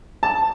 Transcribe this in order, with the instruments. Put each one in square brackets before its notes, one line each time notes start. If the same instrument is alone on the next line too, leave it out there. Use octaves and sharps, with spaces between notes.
[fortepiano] A5